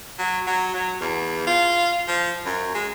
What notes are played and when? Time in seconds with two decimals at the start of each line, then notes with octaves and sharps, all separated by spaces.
0.19 F#3
0.47 F#3
0.74 F#3
1.01 E2
1.47 F4
2.08 F3
2.46 F#2
2.75 G#3